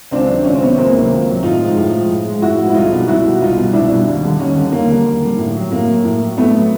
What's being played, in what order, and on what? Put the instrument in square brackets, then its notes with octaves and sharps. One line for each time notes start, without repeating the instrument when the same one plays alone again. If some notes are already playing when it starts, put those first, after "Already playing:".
[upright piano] C#2 C4 D4
C3 D#3 F#3
C#2 C#4
C4
C3 D#3 F#3 B3 C#4
C#2 A#3 C4
C3 D#3 F#3
C#2
C3 D#3 F#3
A2 D#4 F4
F3 G#3
A2
F3 G#3
A2
F3 G#3
A2 E4 F#4
F3 G#3
E4
C2 D#4 F4
B2 G3
C2 E4 F#4
B2 G3
C2 D#4 F4
B2
G3
C2 D4 E4
B2 G3
D#2
D3 G3
D#2 C#4 D#4
D3 G3
D#2 A#3
D3 G3
D#2
D3 G3
A2
F#3
A2 A#3
F#3
A2
F#3
A2 A3 B3
F#3